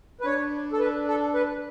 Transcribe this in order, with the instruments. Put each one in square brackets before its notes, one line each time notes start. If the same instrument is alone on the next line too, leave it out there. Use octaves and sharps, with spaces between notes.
[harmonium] B4
[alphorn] D4 [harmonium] C#5
[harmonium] A4
B4
A4
B4